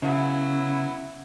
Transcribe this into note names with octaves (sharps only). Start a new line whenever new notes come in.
C#3 F#3 B3 E4